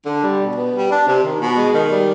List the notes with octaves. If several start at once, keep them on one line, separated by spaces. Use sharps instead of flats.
D3
G3
B2
B3
G3
D4
C3
D#3
B2
G#3
D#3
G3